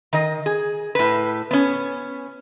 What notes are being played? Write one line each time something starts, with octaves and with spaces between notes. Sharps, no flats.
D#3 D#5
G#4
A2 B4
B3 C#4